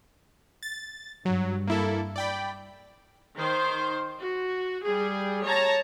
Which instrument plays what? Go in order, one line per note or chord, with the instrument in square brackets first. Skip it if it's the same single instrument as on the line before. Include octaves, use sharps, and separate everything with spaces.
[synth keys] A6
[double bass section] G2 [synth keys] F#3
[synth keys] A#3 E4 A4
D5 G5 B5
[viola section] D#3 C5
F#4
G3 G#4
C#5 A5 A#5